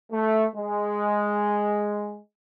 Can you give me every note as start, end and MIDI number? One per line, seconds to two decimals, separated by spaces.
0.12 0.46 57
0.55 2.19 56